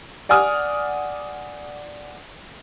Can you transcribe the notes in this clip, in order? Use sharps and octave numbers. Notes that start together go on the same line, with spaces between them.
D5 F#5 G#5 D#6 F6